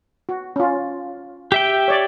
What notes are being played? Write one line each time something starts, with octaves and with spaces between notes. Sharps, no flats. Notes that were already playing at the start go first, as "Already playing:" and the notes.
F#4
C#4 F4
G4 E5 G5
C#5 D5